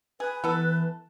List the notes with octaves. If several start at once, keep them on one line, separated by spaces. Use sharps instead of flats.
G#4 B4
E3 B3 A4